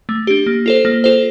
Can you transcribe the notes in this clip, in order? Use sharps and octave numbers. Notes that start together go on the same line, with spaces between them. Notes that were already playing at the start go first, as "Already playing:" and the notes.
A3
D4 G4
A#3
F4 A4 C5
A#3
F4 A4 C5